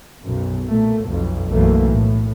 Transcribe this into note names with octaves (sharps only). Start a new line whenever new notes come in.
B1 F#2
A#2 A3
B1 F2
B1 F#2 E3 A3 A#3
A2